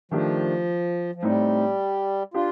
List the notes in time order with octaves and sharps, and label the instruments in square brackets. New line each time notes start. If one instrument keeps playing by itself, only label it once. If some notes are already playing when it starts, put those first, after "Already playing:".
[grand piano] D#3 A3 D4 G4 [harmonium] F3
[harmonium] F3
[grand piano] A2 A3 C4 D#4 [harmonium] G3
[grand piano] D4 G4 [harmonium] F4